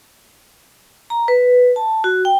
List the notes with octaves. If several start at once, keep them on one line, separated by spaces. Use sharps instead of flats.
A#5
B4
A5
F#4
G5